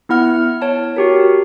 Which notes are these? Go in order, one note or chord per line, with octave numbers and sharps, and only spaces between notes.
B3 E4 F#5 F6
C#5 A5
F#4 G4 A#4